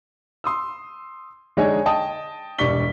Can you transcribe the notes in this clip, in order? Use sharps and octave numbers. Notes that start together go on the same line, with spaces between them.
C6 D#6 E6
D3 G#3 D#4 C#5 G#5
D#5 G5 A5 D#6
E1 G2 D5 C#6 B6 G7